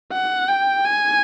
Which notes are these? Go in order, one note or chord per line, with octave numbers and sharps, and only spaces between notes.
F#5
G5
G#5